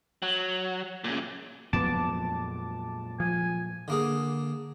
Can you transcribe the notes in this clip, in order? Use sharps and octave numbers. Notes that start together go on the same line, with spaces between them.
F#3
A#2 C#3
F2 A#2 F#3 G#3 B3 A5 D6
F3 G#5
D3 A#3 G#4